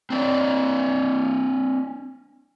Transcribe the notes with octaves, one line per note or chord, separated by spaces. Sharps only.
C4 D4 D5